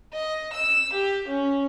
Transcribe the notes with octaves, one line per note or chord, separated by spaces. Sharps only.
D#5
E6
G4
C#4